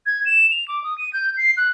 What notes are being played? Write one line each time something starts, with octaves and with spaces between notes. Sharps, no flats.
G#6
E7
F7
D6
D#6
D#7
G6
C7
F#6